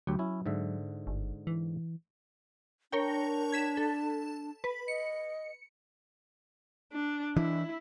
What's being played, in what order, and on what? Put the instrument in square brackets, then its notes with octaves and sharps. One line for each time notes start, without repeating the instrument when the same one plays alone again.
[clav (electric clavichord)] D2 G4 [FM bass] F#3
[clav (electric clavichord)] C#4 E4
G#2 D3 E5
[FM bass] G1
E3
[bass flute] D4 [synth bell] A#4 C#5 G5
[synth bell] G#6 B6 E7
A4
B4
[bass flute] D#5 [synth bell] C#7
[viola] D4
[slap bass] E3 D4 [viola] E4